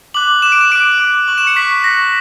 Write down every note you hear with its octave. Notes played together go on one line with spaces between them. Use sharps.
D6 F#6 F#7
D6 F#6 E7
D7
E7
D6 F#6 D7
D6 F#6
C#6 F#6 F#7
E7
C#7
C#6 F#6 B6
C#6 F#6 A#6